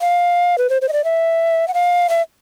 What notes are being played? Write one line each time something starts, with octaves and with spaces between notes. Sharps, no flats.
F5
B4
C5
C5
D#5
D5
E5
F#5
F5
E5